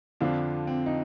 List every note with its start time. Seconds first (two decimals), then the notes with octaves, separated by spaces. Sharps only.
0.21 F2 D3 F3 D4 F4
0.67 C4
0.86 D#4